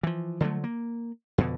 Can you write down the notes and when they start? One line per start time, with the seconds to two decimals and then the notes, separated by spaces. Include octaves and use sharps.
0.03 E3 F3
0.40 D3 F3 F#3 A3
0.64 A#3
1.38 F2 B2 D3